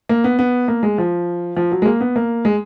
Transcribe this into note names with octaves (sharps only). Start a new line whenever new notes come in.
A#3
B3
B3
A#3
G#3
F3
F3
F#3
G#3
A#3
B3
A#3
G#3